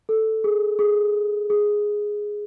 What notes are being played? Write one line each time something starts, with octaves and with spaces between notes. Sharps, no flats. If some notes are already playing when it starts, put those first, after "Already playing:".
A4
G#4
G#4
G#4